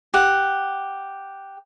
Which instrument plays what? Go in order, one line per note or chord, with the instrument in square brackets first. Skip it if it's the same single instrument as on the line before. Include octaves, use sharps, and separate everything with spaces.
[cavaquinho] G4 F#5